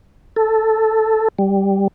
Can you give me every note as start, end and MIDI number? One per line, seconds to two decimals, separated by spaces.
0.36 1.28 69
1.39 1.88 55